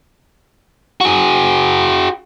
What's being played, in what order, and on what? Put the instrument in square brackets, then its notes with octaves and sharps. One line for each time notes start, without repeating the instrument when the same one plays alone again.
[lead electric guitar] F#4 G#4